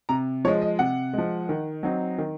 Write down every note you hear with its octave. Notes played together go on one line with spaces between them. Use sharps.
C3 A#5
F3 G#3 C#5
D#5
C3 F#5
F3 G#3
D#3
F#3 C4 D#4
D#3